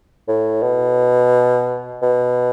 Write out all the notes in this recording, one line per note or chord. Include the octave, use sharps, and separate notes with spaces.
A2
B2
B2